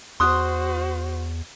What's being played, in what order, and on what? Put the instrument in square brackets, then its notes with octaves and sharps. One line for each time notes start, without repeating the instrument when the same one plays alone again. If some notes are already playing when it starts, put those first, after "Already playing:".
[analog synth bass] E2 [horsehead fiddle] F#4 C5 [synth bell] C6 D#6 F#6